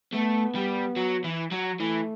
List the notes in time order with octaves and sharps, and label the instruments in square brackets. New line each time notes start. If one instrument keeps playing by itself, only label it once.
[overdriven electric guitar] A3 [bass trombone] B3
[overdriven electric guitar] G3
F#3
E3
F#3
[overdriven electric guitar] E3 [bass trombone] A3